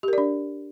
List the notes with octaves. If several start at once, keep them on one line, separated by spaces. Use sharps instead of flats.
D4 G4 A#4 D5